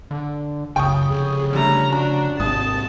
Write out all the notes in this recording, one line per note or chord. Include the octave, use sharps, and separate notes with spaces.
D3
F#1 C#2 C#3 G5 C#6 D#6
F1 G#4
D3 G3 A3 C#4 A#5
D4 F#4 A#5
G#1 G#2 C3 A5 D#6